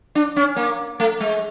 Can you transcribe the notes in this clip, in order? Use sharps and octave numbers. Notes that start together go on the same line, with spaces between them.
D4
C#4
A#3
A3
G#3